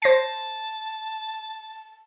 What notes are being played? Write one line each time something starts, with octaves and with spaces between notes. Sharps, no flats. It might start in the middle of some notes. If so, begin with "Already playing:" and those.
C5 A5 A#6 C7